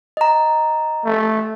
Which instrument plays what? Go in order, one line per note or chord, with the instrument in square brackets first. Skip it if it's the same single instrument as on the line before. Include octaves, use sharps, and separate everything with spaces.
[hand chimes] D#5 A#5
[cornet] A3